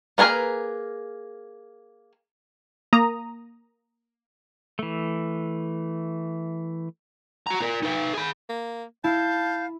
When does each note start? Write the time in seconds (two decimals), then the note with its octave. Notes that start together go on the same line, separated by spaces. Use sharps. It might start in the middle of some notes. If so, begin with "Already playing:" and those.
0.18 A#3 B3 G#4 A#4 B4
2.93 A#3 A#5 D#6
4.79 E3 A3
7.47 F#4 A#5
7.60 F4 A#4
7.83 D#4 B4
8.13 G#4 B5
8.49 A#3
9.04 E4 F5 A5 G6